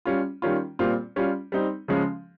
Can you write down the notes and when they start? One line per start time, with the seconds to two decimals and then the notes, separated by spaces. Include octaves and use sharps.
0.05 G3 C#4 F4
0.42 D#3 G3 C#4 F4
0.79 A#2 G3 C4 F4
1.16 G3 C#4 F4
1.52 G3 C4 D#4
1.88 C#3 F3 G#3 C#4